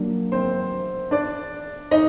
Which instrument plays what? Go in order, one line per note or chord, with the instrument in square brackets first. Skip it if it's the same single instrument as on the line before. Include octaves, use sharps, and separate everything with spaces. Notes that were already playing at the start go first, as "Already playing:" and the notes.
Already playing: [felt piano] F#3 A#3 D4
[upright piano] C4 C5
D4 D5
D#4 D#5